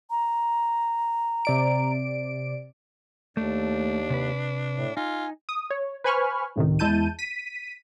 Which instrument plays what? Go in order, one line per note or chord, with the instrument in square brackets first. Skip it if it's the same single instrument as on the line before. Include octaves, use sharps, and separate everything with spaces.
[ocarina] A#5
[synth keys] C3 D5 D7
[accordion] D#2 [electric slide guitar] A3 [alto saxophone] D4
[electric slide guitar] C3 B4
[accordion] A2
[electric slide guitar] D#4 [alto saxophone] F4 [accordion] G#5
[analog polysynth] D#6
C#5
B4 C5 G#5 B5 C#6 F6
C#2 A2 C3 D#3
E2 G#3 E4 A5 G6 D#7
B6 D#7